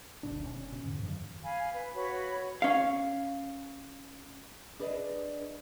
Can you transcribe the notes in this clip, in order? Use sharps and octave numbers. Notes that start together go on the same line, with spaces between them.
F#1 D2 B2 D4
F1 C#4
B2
E2 G#2 D3
F#2 D#3 F3 F#3
F5 G#5 B5
B4
F#4 B4 C#5 B5
C#4 F5
D4 G#4 B4 D5 D#5